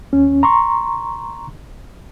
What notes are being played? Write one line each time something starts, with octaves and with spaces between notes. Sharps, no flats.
D#2 C#4
A#5 C6 C#6